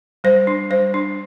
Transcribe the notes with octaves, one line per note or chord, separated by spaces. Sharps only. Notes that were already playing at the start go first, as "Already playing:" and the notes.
G3 C5
D4
G3 C5
D4